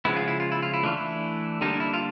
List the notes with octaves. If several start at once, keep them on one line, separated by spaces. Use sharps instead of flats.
C#3 F3 G#3 B3 E4
F4
E4
F4
E4
F4
E4
E3 A3 D4 F4
E4
D3 G3 A#3 D4 D#4
E4
F4